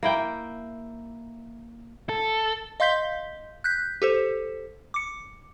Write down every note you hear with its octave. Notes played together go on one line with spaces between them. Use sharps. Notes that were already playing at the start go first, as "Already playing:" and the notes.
A#3 E4 G5
A4
D#5 F5 C6 G6 B6 G7
F#6 G6 B6
G4 A4 C5
D6 C#7